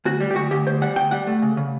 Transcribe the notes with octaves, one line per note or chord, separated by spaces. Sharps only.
D2 F#4
G3
G4
D2 F#4
D2 G4
D2 C5
G3 F#5
D2 G5
G3 F#5
A3
C#3
C#3